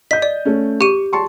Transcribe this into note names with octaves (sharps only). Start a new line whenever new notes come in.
D#5 G6 B6
D5
A3 C#4
G4 C#6 D#7
A5 C6 C#6